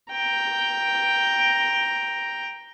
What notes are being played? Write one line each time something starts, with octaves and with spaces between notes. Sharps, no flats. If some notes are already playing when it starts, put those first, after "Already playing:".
G5 A#5